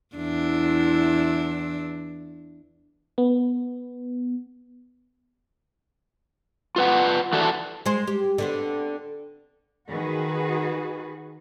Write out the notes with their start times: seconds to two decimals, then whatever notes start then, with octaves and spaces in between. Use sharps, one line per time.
0.16 E2 D4 E4
3.18 B3
6.76 F4 B4 F#5
7.33 E3 F#4 A4 D5 A5
7.86 G#3 C5
8.07 G4
8.38 D3 B3 C4
9.90 D#3 F#4 G#4 B4